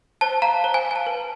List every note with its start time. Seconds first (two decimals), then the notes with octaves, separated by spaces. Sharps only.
0.21 C5 A5
0.42 F5 A#5
0.64 C5 A#5
0.74 G#5
0.85 F5
0.91 G#5
0.96 A5
1.07 B4